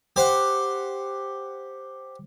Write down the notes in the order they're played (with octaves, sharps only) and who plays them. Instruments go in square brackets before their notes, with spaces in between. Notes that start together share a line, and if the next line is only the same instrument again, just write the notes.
[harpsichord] G4 C5 F#5